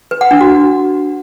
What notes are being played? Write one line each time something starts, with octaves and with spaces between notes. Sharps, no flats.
B4
F#5
D4
F#4